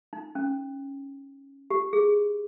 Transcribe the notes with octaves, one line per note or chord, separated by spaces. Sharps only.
D#4
C#4
G4
G#4